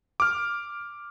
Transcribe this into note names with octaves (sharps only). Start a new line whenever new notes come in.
D6 F6